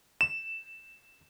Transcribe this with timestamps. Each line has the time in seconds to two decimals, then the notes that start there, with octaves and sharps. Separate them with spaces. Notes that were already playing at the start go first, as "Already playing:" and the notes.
0.21 E7